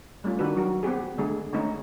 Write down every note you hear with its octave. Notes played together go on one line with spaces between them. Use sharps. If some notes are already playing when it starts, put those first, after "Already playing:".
G3 A3 C#4 F4
D#3 D4 F#4 B4
F#3 F#4 A#4
B3 C4 G4 G#4
D3 G#3 A3 G#4
D3 G#3 A3 C#4 D#4 C#5